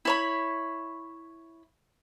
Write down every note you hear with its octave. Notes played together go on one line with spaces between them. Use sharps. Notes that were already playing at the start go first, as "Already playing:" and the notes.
E4 C#5 B5